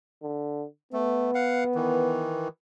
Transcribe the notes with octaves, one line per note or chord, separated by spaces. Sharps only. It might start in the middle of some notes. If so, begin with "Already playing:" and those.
D3
A3 B3
F5 F#5
D#3 E3